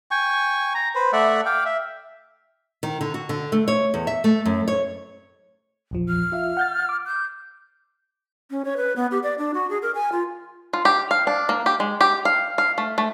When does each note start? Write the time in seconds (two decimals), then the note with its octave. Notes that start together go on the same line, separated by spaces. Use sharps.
0.11 G5 G#5 C#6
0.74 A#5
0.95 B4 C5
1.13 A3 D5 E5 F#5
1.46 F5 G5 D6
1.65 E5
2.83 D#3
3.01 D3
3.14 F#4
3.29 D3
3.52 A3
3.68 C#5
3.94 E2
4.07 E5
4.24 A3
4.46 F#2
4.68 C#5
5.91 A#1 E2 F3
6.09 F6
6.32 F4 E5 F5
6.57 F#5 G6 A6
6.89 D6
7.06 G6
8.51 C#4
8.65 C#5
8.77 B4
8.96 B3
9.11 G4
9.23 D5
9.38 D4
9.54 F#4
9.70 G#4
9.82 A#4
9.95 G#5
10.12 F4
10.73 F4
10.85 G4
11.11 F5
11.27 D4
11.49 A#3
11.66 G4
11.80 G#3
12.01 G4
12.25 F5
12.58 F5
12.78 A3
12.98 A3